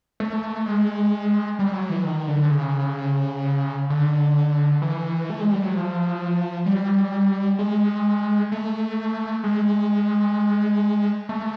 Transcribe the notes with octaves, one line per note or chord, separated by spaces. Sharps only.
A3
G#3
G3
F#3
E3
D#3
D3
C#3
D3
E3
A3
G#3
G3
F#3
F3
G3
G#3
A3
G#3
A3